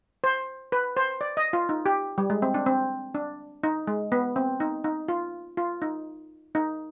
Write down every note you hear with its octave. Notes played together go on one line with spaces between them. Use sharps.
C5
B4
C5
D5
D#5
F4
D#4
G4
G3
G#3
C4
D4
C4
D4
D#4
G#3
B3
C4
D#4
D#4
F4
F4
D#4
D#4